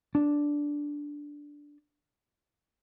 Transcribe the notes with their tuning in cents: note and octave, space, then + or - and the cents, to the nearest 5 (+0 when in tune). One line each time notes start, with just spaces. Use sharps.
D4 -5